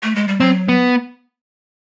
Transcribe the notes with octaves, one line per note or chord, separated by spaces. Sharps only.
A3
G#3
G3
F#3 C4
B3